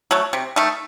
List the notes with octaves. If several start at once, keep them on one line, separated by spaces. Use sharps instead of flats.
F#3 A3
C3
D#3 A3